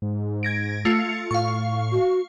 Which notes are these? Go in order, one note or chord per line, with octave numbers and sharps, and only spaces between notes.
G#2
G#6 A#6 D7
A3 F4 C#7
A2 F5 C#6
F#4